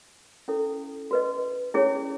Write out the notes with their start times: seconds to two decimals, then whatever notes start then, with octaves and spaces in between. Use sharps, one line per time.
0.48 C#4 E4 A4
1.11 F#4 B4 D#5
1.74 C#4 E4 G#4 C#5